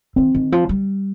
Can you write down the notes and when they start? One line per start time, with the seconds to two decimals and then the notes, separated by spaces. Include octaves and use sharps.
0.16 D#3 C4
0.35 D#3
0.52 F3
0.69 G3